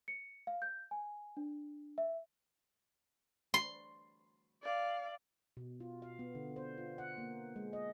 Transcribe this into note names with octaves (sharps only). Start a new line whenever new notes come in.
C#7
F5
G6
G#5
D4
E5
C6
D5 F5
B2
F4
F5
B3
D3
C5
F4
F#5
A#3
G#3
D#5